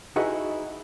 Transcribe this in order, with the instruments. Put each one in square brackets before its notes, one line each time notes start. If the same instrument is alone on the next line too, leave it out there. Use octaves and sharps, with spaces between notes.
[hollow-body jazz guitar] D#4 E4 F#4 G#4 B4 D#5